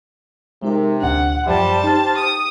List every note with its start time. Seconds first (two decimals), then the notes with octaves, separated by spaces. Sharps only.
0.62 C3 G#3 D#4 A#4
1.01 D2 A#2 D4 F#5
1.46 F#2 F3 G3 C5 E5 A5
1.84 D#4 G4 F6
2.17 D#6